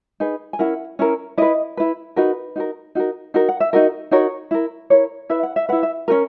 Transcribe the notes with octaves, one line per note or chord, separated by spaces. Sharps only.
D#4 G#4 B4
G#5
C#4 E4 A#4 F#5
C#4 E4 A#4
E4 B4 D#5
E4 B4
D#4 F#4 A#4 B4
D#4 F#4 A#4
D#4 F#4 A#4
D#4 F#4 A#4
F#5
E5
D#4 F#4 A#4 D#5
D#4 F#4 A#4 C#5
E4 A#4
E4 A#4 C#5
E4 B4 E5
F#5
E5
E4 B4 F#5
E5
C#4 F#4 A#4